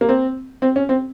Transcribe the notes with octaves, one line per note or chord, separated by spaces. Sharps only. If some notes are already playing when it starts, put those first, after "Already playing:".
A#3
C4
C4
C#4
C4